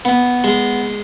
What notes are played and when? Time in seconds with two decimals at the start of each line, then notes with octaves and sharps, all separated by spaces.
0.05 B3
0.44 G#3